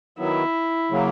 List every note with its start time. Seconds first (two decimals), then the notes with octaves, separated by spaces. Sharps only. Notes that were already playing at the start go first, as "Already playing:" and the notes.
0.19 D#3 F#3 B3 E4
0.90 C#3 F#3 A#3